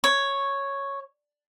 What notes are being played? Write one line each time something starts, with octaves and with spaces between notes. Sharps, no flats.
C#5